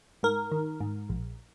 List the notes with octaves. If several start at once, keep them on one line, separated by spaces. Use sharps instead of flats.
G#2 A#4
D#3
G#2
A#1